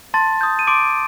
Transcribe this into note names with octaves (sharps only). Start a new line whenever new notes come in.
A5 C6 A6
D#6 G6
D#7
C6 D6 D7